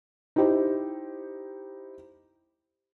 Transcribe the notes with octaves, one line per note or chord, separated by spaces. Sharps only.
D#4 E4 G4 C5